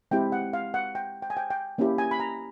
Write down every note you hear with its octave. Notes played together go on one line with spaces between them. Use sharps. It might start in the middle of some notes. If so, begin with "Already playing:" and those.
G#3 C4 E4 G4 G5
F#5
F5
F#5
G5
G5
G#5
G5
G5
A#3 C#4 E4 G4
G#5
B5
A#5